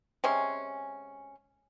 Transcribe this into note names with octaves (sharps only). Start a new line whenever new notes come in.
C3 G#3 C#4 C6